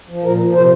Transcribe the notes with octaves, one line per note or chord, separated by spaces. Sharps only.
F3
A#2 A#4
F3
C3 C5